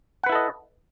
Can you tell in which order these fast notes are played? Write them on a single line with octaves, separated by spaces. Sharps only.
F#5 B4 E4 A4 D#5